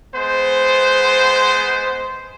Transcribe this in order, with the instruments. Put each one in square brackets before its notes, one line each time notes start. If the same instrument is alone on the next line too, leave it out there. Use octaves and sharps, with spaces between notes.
[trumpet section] G#3 B3 C5